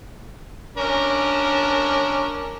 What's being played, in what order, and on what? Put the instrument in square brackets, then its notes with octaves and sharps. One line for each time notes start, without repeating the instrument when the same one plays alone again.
[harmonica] C#4 D4 A#4